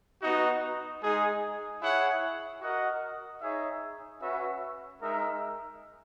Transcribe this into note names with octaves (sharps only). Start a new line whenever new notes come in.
B3 D#4 F#4
G#3 D#4 G#4
E4 G#4 C#5 F#5
F#4 A#4 D#5 F#5
D#4 G#4 C#5 E5
C#4 F#4 B4 E5
G#3 D#4 A#4 E5